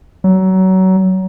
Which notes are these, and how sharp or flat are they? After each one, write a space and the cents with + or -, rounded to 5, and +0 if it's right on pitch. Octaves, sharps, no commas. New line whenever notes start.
F#3 +25